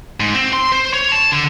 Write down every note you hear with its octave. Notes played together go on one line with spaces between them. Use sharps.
G#2
C4
C6
C5
C#5
A5
D3